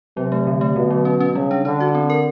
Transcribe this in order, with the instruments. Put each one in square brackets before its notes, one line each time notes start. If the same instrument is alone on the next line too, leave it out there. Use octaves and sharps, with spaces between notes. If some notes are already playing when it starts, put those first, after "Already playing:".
[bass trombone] C3 [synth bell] F#3
[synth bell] A3
D3
A3
[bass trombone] B2 [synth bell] D3
[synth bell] F#3
C#4
C#4
[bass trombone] C#3 [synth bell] G3
[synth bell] D4
[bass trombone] D3 [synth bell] D4
[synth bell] F#4
C4
A#4